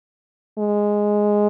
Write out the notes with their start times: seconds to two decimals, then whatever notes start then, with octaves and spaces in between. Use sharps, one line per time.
0.58 G#3